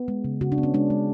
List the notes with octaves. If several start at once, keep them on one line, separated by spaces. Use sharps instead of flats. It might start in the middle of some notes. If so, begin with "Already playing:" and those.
Already playing: B3
G#3
C#3
C#3 F#4
D4
B3
C#4
G#3 D4
G#3